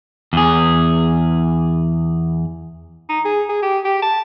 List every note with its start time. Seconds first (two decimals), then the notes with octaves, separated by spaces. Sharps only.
0.33 E2 G#4
3.09 D#4
3.25 G#4
3.49 G#4
3.62 G4
3.85 G4
4.02 A5